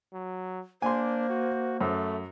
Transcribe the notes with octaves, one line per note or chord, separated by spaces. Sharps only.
F#3
A#3 D4 C5 G#5 C6
F#4
F#2 A3